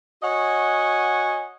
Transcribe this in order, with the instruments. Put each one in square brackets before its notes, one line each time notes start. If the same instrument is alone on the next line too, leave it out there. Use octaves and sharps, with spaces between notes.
[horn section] F#4 C#5 D#5 F#5 G#5